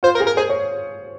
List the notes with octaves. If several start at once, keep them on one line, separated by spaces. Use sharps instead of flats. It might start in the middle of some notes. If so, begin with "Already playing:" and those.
F4 C5
A#4
G#4
A#4
G#4 C5
C#5